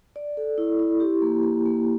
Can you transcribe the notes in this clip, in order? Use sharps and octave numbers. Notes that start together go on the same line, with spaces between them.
D5
A4
E4
E4
G4
A#3
A#3
A#3